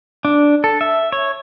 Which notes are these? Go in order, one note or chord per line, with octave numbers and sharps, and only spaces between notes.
D4
A4
E5
C#5